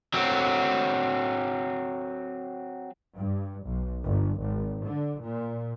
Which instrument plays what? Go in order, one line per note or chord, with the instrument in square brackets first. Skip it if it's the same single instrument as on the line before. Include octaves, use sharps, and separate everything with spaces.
[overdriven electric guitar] F#3 C4
[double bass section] G2
B1
G1
G#1
D3
A#2